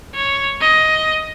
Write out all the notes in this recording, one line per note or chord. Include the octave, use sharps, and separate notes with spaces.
C#5
D#5